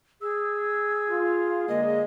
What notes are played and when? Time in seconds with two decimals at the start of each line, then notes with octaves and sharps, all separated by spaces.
0.21 G#4 E6
1.09 F4
1.68 D3 G#3 A#3 D#5